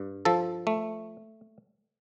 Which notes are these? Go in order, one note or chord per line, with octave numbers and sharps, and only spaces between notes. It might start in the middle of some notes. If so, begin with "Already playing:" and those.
Already playing: G2
F3 A4
A3